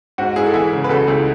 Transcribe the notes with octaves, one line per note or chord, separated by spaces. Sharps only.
G#2 F#4
G#2 E4 G#4
A4
E3 E4 G#4
C#3
B4
C#3 F#4 A4
C#2 E4 G#4